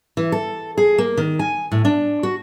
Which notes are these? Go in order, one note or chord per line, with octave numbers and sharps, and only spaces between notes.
E3
A4
G#4
A#3
D#3
G#5
A2
D4
F#4